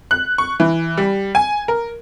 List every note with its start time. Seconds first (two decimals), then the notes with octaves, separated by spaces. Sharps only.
0.11 F#6
0.38 C#6
0.60 E3
0.98 G3
1.35 G#5
1.68 A#4